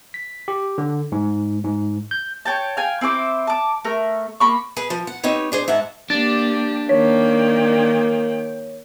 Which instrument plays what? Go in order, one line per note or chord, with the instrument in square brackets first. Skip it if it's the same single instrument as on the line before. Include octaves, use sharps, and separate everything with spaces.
[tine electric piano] B6
G4
D3
G#2
G#2
G6
[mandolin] C#5 G5 A5
F5 G5 G#5
C4 E4 C5 D6
A5 D6
A3 A#4
A#3 B5 C#6
[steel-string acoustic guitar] G#4 B4
F3
F#5
C4 D#4 G4 B4 C#5
D4 G#4 C5
G#2 E5 F#5 A5
[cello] A#3 G4 [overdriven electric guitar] D4 [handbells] A6
[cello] D#3 G5 [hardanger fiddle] A#3 [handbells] C#5 B6